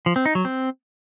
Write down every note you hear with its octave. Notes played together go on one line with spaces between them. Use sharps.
F3
C4
D#4
F#3
C4